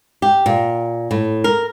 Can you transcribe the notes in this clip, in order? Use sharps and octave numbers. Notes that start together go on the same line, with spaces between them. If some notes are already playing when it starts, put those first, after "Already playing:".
G4
A#2
A2
A#4